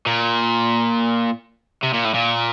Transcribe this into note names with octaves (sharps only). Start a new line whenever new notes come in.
A#2
C3
A#2
A2
A#2